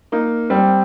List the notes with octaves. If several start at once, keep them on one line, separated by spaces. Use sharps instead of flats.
A#3 D#4
G3 C4